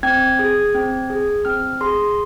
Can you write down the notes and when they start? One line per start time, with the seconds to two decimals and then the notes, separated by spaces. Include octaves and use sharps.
0.03 C4 G#6
0.39 G#4
0.74 C4
1.10 G#4
1.45 C4 F6
1.81 G#4 C6